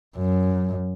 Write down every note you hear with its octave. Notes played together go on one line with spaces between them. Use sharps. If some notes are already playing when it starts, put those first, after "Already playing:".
F#2